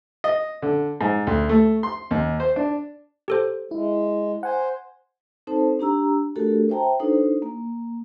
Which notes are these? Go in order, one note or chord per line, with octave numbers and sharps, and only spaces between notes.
D#5
D3
G#2
D2
A3
C6
D#2
C5
D4
G4 A4 C5
G#3 E4
C5 F#5 G#5
C4 D#4 A4 C5 A5
D4 G4 A#5 E6
A3 D4 F#4 G4 A4 A#4
C5 E5 G5 A5 A#5
D4 D#4 F#4 A4 B4 C5
A#3